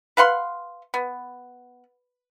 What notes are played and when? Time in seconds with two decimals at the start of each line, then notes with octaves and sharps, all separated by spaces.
0.17 B4 F5 F#5 C6
0.94 B3